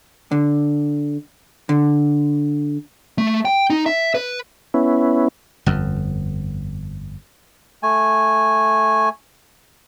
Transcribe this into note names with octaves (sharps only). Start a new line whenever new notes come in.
D3
D3
A3
G5
D#4
E5
B4
B3 C#4 E4
G1 F2
A3 G#5